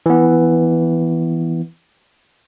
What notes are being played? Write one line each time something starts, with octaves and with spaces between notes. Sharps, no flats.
E3 B3